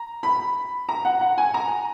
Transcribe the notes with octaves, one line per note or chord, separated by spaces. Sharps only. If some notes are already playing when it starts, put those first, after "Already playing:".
Already playing: A#5
B5
A#5
F#5
F#5
G#5
A#5